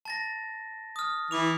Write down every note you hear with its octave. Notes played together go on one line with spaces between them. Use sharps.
A5 A6 A#6
D#6 F6
E3 D6 F7